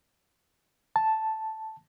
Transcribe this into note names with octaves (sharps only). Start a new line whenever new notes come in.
A5